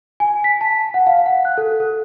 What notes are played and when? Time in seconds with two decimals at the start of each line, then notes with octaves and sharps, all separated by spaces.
0.20 G#5
0.44 B6
0.61 A5
0.94 F#5
1.07 F5
1.26 F#5
1.45 F#6
1.58 A4
1.80 A4